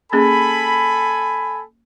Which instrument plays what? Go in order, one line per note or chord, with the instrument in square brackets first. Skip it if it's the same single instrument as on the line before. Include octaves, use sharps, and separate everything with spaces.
[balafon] A#3 C#4 G#4 [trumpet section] A4 G#5 B5